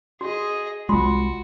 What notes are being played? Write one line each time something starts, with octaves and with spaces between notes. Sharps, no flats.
F#4 G#4 D#5
C2 G#3 F4 F#4 C6